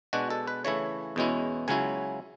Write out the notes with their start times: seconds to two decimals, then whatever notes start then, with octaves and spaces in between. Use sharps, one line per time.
0.13 B2 G#3 D4 F#4
0.30 A4
0.47 B4
0.65 C#3 E3 A3 E4 C#5
1.16 E2 B2 G#3 C#4 E4
1.68 C#2 C#3 F#3 C#4 E4 G#5